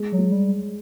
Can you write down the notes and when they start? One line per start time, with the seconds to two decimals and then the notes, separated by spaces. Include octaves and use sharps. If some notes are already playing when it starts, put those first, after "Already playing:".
Already playing: G#3
0.12 F#3
0.19 G#3
0.32 G3